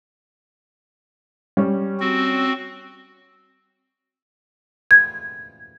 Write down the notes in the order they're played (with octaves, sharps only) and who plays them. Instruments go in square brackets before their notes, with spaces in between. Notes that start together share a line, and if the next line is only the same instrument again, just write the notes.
[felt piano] G3 C#4
[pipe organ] C4 F#4
[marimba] G#6